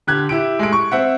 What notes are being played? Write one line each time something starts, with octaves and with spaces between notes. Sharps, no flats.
D3 G4 F#6 G#6
E4 G4 D7
G#3 A3 D7
C#6
C4 E5 F#5